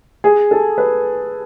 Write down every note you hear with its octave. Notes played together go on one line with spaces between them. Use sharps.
G#4
A4
B4